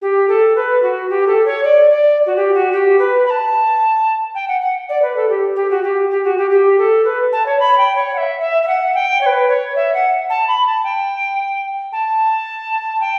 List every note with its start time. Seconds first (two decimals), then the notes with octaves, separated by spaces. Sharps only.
0.01 G4
0.28 A4
0.55 B4
0.82 F#4
1.09 G4
1.26 A4
1.45 C#5
1.63 D5
1.90 D5
2.26 F#4
2.36 G4
2.53 F#4
2.71 G4
2.98 B4
3.25 B5
3.30 A5
4.34 G5
4.47 F#5
4.61 F#5
4.88 D5
5.02 B4
5.15 A4
5.28 G4
5.55 G4
5.70 F#4
5.82 G4
6.10 G4
6.24 F#4
6.37 G4
6.50 G4
6.78 A4
7.04 B4
7.32 A5
7.45 C#5
7.59 B5
7.77 G5
7.95 C#5
8.13 F#5
8.17 E5
8.40 E5
8.62 E5
8.67 F#5
8.94 G5
9.21 C#5
9.26 B4
9.48 C#5
9.75 E5
9.93 F#5
10.29 A5
10.47 B5
10.65 A5
10.83 G5
11.92 A5
13.00 G5